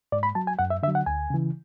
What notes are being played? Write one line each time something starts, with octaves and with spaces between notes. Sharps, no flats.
G#2 D5
B5
F#3 A5
G#5
F#2 F#5
E5
D3 F#3 E5
F#5
D2 G#5
C#3 E3